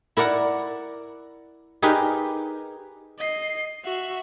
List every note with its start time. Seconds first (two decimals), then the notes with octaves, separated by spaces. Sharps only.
0.17 E4 A#4 D5 F#5 A#5
1.82 D#4 G4 G#4 A#4 B4
3.19 D#5 C7
3.84 F#4 E5